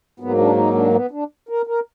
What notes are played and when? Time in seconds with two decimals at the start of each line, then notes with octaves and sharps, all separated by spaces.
0.20 G#2 F#3 A#3 B3
0.38 D4
0.57 D#4
0.75 D4
0.94 B3
1.11 D4
1.49 A#4
1.67 A#4